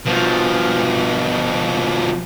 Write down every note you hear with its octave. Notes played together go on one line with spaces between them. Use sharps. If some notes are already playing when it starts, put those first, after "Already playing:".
B2 F3